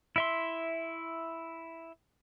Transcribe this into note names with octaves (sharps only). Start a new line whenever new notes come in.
E4 E5 C6